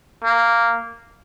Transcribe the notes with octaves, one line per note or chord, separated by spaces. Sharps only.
A#3